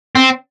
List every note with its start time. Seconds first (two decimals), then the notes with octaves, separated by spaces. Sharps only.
0.15 C4